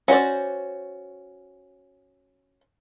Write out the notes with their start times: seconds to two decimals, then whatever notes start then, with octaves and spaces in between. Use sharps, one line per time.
0.08 C#4 F#4 C5 D5